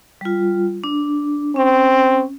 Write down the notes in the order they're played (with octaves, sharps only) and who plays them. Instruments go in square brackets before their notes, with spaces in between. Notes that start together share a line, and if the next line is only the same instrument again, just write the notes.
[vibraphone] G3 F4
D4
[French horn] C4 [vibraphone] C#4